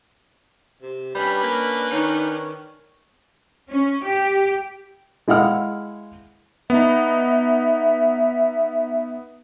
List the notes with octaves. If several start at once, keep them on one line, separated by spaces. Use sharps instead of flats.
C3
G3 C#4 D4 B4 B5
A#3
D#3 D#4 C#5
C#4
G4
G#3 E4 F5 F#5 F6
B3 D#4 E5